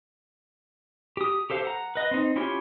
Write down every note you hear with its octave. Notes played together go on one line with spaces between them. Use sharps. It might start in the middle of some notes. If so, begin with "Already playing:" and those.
G4 D#6
G4 A4 C5 F5
F#5 A#5
B4 D#5
C4 D#4
C#4 E4 F4 G4 C#5